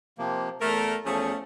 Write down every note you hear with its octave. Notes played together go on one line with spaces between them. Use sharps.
C3 F3 A#3
E2 A3 A#4 F6
E2 F3 A3 C#4 G#4